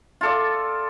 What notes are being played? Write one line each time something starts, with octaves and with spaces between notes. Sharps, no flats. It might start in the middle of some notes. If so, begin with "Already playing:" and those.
F4 A4 D5